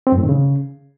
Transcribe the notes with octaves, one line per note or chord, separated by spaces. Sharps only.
C4
F#2
A2
D#3
C#3